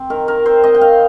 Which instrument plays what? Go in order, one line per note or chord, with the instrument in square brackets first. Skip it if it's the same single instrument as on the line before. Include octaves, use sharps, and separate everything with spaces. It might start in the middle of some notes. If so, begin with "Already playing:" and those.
Already playing: [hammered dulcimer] C4
D#3 A#4
D#3 A#4
C4 C5
C4 D#5
G5
D#3 F5